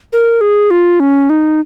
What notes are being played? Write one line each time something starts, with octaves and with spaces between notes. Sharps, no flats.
A#4
G#4
F4
C#4
D#4